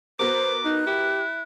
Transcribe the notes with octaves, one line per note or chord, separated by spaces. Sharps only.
B3 F#4 A#4 C5 D6
D#4 F#6
E4 G4